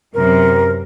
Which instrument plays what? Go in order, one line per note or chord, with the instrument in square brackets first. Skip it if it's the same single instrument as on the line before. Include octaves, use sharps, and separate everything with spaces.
[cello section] F#2 C3 E3 [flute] A#4